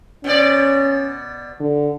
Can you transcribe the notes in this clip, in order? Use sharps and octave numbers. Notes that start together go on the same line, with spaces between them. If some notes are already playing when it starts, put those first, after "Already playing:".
B2 B3 C#4 D5
D3